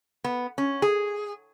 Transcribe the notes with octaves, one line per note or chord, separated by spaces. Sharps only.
B3
C#4
G#4